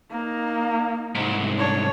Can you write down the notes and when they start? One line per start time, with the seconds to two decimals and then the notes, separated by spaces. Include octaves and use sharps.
0.11 A#3 D#4
1.15 C2 G#2
1.58 D4 C#5